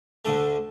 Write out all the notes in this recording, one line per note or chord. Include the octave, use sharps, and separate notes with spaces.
D2 D3 A3 A5